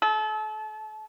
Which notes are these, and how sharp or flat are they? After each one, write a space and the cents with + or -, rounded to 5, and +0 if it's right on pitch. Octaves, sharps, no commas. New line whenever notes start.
A4 -35